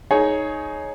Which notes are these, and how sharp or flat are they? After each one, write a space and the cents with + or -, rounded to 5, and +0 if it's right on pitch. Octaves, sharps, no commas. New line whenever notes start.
D#4 +0 G#4 +20 C#5 +0